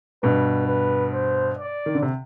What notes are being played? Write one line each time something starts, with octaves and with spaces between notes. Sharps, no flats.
G2 B2 B4
B4
C5
D5
D#3
D3
C3